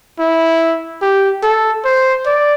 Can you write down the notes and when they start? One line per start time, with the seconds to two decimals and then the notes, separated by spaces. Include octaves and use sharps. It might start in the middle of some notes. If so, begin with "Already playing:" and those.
0.19 E4
1.02 G4
1.43 A4
1.85 C5
2.26 D5